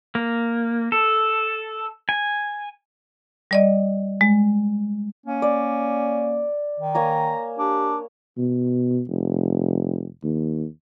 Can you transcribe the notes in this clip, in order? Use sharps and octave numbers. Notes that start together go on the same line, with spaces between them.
A#3
A4
G#5
G3 D5 D#5
G#3
A#3 C#4
D5
D#3
A#3 C#5 G#5 A#5
D4 G4
B2
F1
D#2